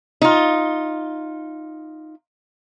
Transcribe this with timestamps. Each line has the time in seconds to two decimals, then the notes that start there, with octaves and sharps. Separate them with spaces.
0.22 D#4 F4